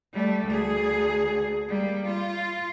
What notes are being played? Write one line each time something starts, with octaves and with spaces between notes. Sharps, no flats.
G3 A3
D2 G#4
G3 A#3
F4